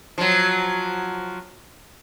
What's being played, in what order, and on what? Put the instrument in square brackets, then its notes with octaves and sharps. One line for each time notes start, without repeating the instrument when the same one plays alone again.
[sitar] F3 F#3